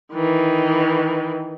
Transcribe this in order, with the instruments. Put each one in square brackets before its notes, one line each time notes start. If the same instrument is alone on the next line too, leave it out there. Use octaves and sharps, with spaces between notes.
[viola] D#3 E3